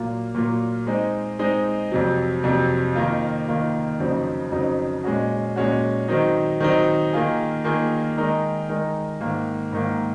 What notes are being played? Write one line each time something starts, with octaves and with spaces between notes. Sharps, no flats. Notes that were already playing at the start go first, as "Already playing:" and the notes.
Already playing: A#2 F#3 A#3 F4
A#2 F#3 A#3 F4
G#3 C4 D#4
G#3 C4 D#4
F2 C3 F#3
F2 C3 F#3
D#3 A#3 F4
D#3 A#3 F4
F2 C#3 F#3 C4 D#4
F2 C#3 F#3 C4 D#4
A#2 G#3 C#4 F#4
A#2 G#3 C#4 F#4
D#3 F#3 C4 D#4
D#3 F#3 C4 D#4
D#3 A#3 F4 G#4
D#3 A#3 F4 G#4
D#3 G#3 D#4 A#4
D#3 G#3 D#4 A#4
G#2 D#3 A#3
G#2 D#3 A#3